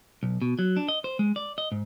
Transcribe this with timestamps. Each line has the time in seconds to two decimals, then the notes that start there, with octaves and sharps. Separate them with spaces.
0.23 B1
0.42 B2
0.59 F#3
0.77 D4
0.88 D#5
1.04 C5
1.19 G#3
1.36 D5
1.58 D#5
1.72 G#2